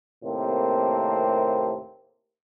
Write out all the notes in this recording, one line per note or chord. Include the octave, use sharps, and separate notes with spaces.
D#2 A2 C3 A3 A#3 C4